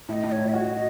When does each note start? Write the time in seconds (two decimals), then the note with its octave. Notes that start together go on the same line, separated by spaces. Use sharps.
0.09 A2 E5
0.13 D#5
0.24 A2 D#5
0.32 C#5
0.38 A2
0.48 E5
0.52 F#4 D#5